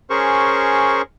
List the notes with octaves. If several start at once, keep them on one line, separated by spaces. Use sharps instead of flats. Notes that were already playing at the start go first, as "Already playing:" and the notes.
C#4 G#4 A#4 C5 C#6